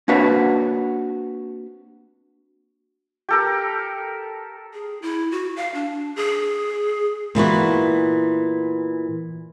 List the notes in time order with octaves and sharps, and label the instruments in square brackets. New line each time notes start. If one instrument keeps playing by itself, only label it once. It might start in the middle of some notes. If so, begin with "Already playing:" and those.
[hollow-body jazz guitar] A#3 C4 D4 F#4 B4 C#5
[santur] G4 A4 A#4
[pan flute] G#4
E4
F#4
F5
D4
G#4
[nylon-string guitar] A#2 E3 B3 F#4